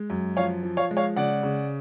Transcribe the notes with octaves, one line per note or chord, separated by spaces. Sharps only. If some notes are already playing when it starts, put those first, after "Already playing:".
Already playing: G#3
F#2
F3 C#5 F5
F3
C#5 F5
G#3
C#5 F5
C#3 D5 F#5
C#3